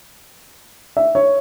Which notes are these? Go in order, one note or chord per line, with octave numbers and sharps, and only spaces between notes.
E5
C#5